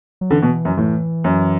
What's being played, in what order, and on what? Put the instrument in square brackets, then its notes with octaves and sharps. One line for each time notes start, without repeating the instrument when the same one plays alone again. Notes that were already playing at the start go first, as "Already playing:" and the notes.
[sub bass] F#3
[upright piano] D3 [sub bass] E3
[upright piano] B2
F#2
[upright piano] A2 [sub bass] E3
[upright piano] F#2